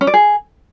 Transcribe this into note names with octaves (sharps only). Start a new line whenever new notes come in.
C#4
D5
G#4